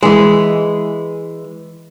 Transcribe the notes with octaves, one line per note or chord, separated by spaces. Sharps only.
E3 G#3